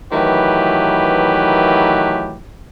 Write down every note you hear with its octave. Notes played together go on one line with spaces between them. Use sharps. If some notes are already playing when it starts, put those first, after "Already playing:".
D#3 E3 F#3 A3 G4 B4